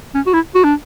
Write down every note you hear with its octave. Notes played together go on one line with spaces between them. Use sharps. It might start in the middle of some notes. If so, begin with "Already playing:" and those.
C#4
F#4
E4
F#4
D4